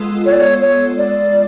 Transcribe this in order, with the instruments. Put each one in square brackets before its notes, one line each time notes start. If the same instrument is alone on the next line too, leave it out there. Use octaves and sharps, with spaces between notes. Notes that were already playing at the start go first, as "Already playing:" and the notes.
Already playing: [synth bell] G#3 B3 F4 A4
[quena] C#5
D5
C#5
C#5
D5